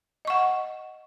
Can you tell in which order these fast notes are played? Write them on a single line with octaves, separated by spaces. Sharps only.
D#5 C#6 F#5